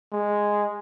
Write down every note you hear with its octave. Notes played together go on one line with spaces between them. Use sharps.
G#3